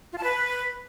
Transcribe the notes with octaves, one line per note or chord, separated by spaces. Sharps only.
F4
A5
B4